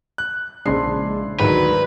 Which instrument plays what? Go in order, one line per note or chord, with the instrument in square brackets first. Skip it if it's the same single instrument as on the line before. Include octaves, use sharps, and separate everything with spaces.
[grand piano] F#6
[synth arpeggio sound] A#1 C#3 G#3 [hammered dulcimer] D4 E4 C5 [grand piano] C7
[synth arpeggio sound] D2 G#2 [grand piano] D#3 F#3 [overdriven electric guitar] B4